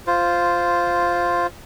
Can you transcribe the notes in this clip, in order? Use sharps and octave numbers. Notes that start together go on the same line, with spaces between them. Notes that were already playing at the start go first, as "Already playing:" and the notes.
F4 C5